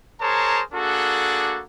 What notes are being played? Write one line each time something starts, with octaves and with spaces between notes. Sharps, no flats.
G#4 A#4 C5 C#5 A5 A#5
A#3 D4 F#4 G#4 A4